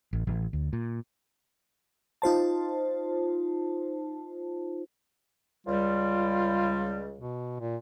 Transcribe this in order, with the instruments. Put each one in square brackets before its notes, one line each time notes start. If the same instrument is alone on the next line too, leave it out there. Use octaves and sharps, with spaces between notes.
[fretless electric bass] A1
A1
D2
A#2
[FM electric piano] D#4 F4 C5 A5
[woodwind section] C#2 G3 [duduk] F4
[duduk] B2
A#2